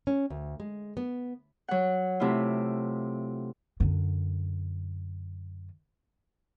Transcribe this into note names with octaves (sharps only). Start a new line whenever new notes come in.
C#4
D2
G#3
B3
F#3 F#5
C3 A3 E4 F4
F#2 D3